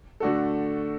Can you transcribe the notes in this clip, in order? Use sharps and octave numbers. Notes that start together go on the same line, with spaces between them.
D3 A3 D4 F#4 A4